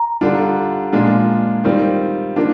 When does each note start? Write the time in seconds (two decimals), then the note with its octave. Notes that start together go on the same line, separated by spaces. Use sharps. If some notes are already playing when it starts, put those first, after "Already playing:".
Already playing: A#5
0.21 D3 G3 D4 F4
0.93 A#2 F3 G#3 D4 F4
1.64 D#3 G3 C4 F4
2.36 D#3 A#3 D4 F4